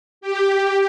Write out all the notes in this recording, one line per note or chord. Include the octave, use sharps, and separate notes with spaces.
G4